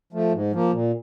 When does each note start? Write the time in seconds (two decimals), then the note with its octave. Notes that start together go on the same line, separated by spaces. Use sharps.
0.13 F3 A3
0.32 G#2
0.52 F3 A#3
0.72 A#2